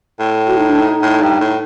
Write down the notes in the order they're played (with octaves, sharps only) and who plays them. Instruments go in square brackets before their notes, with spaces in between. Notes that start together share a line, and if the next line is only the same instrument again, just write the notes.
[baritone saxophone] A2
[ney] F#4
D#4
D4
D#4
[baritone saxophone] A2
G2
A2